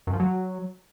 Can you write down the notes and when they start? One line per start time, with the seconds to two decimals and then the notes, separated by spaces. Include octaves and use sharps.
0.07 F#2
0.13 F3
0.20 F#3